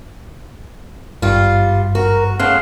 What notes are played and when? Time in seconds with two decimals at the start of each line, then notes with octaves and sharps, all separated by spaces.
1.22 G#1 G2 G3 F4
1.95 F#4 A#4
2.39 C#3 A3 F5 F#5 C6